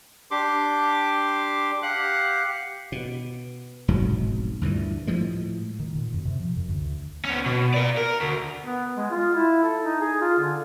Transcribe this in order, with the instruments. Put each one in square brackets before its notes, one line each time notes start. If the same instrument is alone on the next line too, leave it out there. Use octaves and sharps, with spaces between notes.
[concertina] D4 G4 C6 D6
G4 F5 F#5 F#6
[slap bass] B2
F1 B1 G#2 F#3
D2 G2 A#2 E3
A2 F3 G#3
[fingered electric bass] D#3
A#2
F#2
C3
F3
F#2
D2
[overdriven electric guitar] B3 C#4
B2
A#4 D5
A#4
D2
[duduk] B3
G#3
F4
E4
A4
D#4
G#4
F4
D3